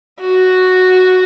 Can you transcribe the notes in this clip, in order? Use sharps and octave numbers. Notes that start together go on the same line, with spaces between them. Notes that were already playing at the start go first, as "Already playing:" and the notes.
F#4